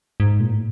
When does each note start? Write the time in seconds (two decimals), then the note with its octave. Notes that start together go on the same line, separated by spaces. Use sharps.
0.20 G#2
0.40 A#2
0.52 A2